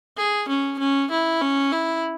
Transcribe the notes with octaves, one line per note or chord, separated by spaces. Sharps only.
G#4
C#4
C#4
E4
C#4
E4